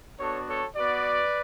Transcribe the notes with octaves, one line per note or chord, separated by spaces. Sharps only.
B3 D4 F#4 A4 C#5
A4 C#5
B3 F#4 B4 D5